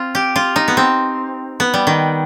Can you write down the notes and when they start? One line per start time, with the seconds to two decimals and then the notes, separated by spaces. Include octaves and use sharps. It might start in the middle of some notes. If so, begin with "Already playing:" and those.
Already playing: C4 F4
0.15 G4
0.36 F4
0.56 D#4
0.68 B3
0.77 C4
1.60 B3
1.74 G3
1.87 D#3